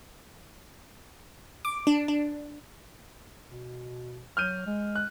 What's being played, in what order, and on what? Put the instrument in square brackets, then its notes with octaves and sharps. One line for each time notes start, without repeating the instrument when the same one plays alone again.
[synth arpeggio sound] D6
D4
D4
[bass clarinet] B2
[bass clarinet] F#3 [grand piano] F6 G6 D#7
[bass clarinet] G#3
[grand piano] F#6